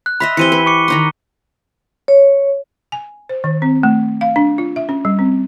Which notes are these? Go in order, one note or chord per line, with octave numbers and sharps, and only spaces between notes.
F#6
D#5 E5 B5 C6 B6
E3 C4 G4 C#7 D#7 G7
B4
C#6 D6 C#7
D#3 D#4 C6
C#5
G#5
C5
D#3
C4
A3
F5
D4
F4
E5
C#4
G3
C4